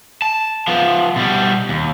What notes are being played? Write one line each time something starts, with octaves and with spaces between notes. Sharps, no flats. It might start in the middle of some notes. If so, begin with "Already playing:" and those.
A5
F3 B3
B2 G3
D#2